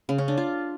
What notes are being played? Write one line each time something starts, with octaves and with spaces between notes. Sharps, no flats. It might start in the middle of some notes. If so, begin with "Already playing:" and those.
C#3
C#4
D4
F4